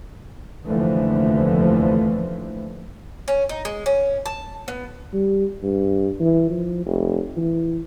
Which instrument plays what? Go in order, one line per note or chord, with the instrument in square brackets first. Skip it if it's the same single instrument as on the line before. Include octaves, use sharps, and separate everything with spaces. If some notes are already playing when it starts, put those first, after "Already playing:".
[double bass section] F1 D#2 D3 E3 F3 A3
[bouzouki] C#4
D#4
G#3
C#4
A5
B3
[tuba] G3
G2
E3
F3
F1
E3